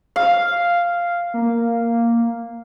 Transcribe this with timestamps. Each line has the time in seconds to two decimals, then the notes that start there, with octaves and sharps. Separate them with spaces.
0.16 F5
1.34 A#3